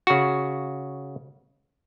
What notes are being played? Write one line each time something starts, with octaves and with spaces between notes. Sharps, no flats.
C#3 F#4